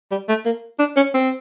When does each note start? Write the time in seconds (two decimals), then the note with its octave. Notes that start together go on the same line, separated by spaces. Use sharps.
0.11 G3
0.29 A3
0.45 A#3
0.79 D4
0.96 C#4
1.14 C4